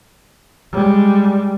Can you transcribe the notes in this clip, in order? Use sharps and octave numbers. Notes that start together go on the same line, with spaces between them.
G3 G#3